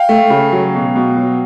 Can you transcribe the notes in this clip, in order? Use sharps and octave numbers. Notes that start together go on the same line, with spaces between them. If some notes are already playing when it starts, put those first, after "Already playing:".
Already playing: F5 G5
A3
C#3
F#3
B2
B2
F#3